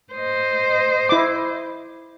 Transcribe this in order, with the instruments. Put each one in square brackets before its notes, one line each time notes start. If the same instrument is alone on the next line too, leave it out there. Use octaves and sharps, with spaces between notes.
[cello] C5 D#5
[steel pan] E4 D6